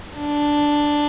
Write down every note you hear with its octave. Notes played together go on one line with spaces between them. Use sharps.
D4